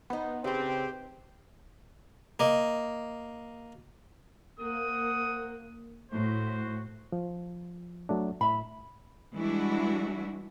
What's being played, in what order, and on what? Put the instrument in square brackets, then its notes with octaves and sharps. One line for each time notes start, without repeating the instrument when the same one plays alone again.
[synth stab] B3 [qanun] D#4 C5
[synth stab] C#3 [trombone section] C4 [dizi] G4 [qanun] B4 C5
[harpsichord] A#3 D#5
[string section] A#3 [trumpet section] C5 F#5 D#6
[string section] A2 [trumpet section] F#4 C5
[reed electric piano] F3
F#3 A3 D4
[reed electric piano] A2 [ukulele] E5 B5
[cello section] E3 G3 G#3 D4 E4 F#4